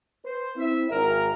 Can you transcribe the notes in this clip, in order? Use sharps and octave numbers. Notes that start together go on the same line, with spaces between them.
B4 C5
C4 E4 E5
G#1 A#4